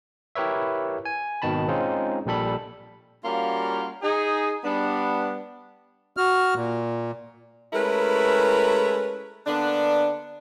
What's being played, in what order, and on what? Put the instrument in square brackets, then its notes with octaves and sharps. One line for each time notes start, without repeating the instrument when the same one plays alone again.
[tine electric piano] E4 G4 A#4 B4 C#5 E5
G#5
G#1 B2 D#3 A5 B5
G#3 C4 C#4 D#4 F4
A#1 A#2 G3 A4 B5
[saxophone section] G3 A#3 C#4 F4 F#4 A#4
D#4 G#4
G3 B3 D4
[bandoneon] F#4 F6
A#2
[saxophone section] G#3 A3 C#4 E4 A#4 B4
D3 A#3 B3 D4